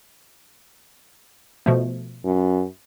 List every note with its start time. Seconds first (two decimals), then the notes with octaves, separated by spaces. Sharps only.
1.66 B2 F3 A3
2.25 F#2